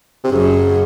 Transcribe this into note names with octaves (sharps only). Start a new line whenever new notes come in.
C3
F#2 C#3